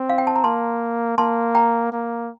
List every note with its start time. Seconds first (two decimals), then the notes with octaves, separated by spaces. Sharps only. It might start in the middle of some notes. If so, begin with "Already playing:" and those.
Already playing: C4
0.10 F5
0.18 G5
0.27 A5
0.36 A#5
0.44 A#3 A5 C6
1.18 A#3 A5 C6
1.55 G5 A#5
1.92 A#3